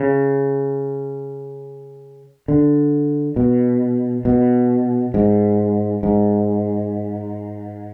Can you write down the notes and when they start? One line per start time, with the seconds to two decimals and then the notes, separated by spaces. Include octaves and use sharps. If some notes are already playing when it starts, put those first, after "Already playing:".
Already playing: C#3
2.48 D3
3.36 B2
4.25 B2
5.14 G#2
6.03 G#2